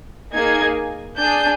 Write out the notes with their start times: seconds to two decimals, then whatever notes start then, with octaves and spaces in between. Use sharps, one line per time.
0.33 A#3 D#4 G#4 G#6
1.19 D4 G#4 G6